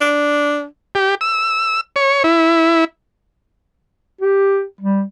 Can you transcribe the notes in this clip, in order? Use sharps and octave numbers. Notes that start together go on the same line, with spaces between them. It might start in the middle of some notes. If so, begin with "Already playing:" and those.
D4
G4
E6
C#5
E4
G4
G3